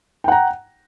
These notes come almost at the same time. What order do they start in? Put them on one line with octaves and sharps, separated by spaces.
G5 F#5 A#5